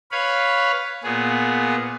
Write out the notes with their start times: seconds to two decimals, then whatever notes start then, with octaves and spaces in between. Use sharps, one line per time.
0.12 B4 C#5 F5 B5
1.04 A#2 B3 G#4